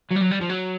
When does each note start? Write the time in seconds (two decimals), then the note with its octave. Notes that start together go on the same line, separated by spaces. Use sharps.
0.11 F#3
0.16 G3
0.22 F#3
0.31 G3
0.41 F3
0.50 F#3